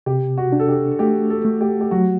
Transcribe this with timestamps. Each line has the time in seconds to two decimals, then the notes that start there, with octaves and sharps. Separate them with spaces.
0.06 C3 G4
0.38 F#4
0.52 D4
0.59 A4
0.68 G4
0.99 A3 G4
1.30 A4
1.45 A3
1.61 G4
1.81 G4
1.91 F#3 F#4